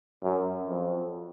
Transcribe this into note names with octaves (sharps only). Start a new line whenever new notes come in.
F#2
F2